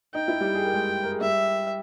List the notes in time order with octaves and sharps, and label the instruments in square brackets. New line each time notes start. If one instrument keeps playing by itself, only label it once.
[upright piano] D#4 [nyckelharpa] G5
[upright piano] E4
G3 G4
G#4
A#4
G#3 G#4
A#4
G#4
[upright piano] G3 G4 [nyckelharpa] E5